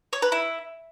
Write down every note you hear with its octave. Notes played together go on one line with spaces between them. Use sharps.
C#5
B4
E4